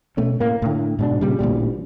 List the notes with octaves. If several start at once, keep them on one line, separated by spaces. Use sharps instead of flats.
B2 A3 C#4
A2 A#3
A2 D3
G#2 B2 D4
A#2 C#3 G3
A1 D2 A#2 G3